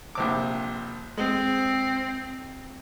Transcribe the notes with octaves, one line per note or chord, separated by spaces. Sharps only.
A#1 C3 D6
G#3 C4